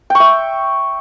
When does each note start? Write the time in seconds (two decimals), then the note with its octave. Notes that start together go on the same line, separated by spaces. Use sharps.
0.10 G5
0.15 C#6
0.20 E5